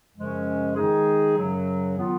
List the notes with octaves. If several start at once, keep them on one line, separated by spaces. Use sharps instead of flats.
F#2 C#3 F3 G#3 C#4
D#3 G#3 D#4 G#4
F#2 C#3 F#3
D#3 F#3 B3 F4